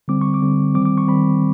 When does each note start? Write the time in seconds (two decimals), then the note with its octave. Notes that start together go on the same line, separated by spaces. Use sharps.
0.08 D3 G3 C4 D6
0.21 C#6
0.34 D6
0.42 D3 G3 C4
0.74 D#3 G3 C4 D6
0.85 D6
0.98 C#6
1.08 D#3 G3 C4 B5